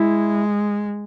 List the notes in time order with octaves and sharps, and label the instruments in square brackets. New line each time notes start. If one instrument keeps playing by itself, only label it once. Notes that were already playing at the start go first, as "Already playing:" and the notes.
Already playing: [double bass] G#3 [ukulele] E4